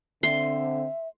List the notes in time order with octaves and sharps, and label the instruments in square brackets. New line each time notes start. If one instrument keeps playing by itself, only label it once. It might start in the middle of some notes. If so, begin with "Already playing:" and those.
[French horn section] D3 C4 [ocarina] E5 [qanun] C6